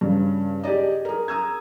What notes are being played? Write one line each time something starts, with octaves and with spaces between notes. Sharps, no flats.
G2 C#3
G4 G#4 D5 D#5
G#4 A#4
A#5 D#6 E6 G#6